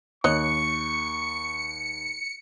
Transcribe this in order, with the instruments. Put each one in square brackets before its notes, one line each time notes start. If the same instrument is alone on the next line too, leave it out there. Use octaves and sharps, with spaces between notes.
[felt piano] D#2 F#6 [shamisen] C#5 D#5 [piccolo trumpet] C#6 [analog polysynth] C#7